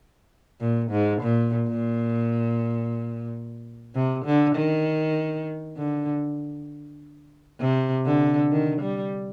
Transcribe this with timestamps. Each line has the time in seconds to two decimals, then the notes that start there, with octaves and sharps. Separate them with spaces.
0.61 A#2
0.91 G#2
1.22 A#2
1.67 A#2
3.95 C3
4.25 D3
4.56 D#3
5.77 D3
7.60 C3
8.06 D3
8.51 D#3
8.81 G3